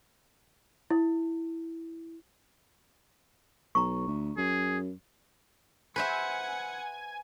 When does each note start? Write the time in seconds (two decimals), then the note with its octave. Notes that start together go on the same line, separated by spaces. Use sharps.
0.90 E4
3.75 B1 A#5 C#6
4.08 D2
4.38 F#2 G#4
5.96 B4 C5 E5 F#5 G#5 C#7